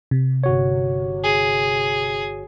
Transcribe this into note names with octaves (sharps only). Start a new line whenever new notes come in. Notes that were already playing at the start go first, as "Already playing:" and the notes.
C3
G1 F#4 C#5
G#4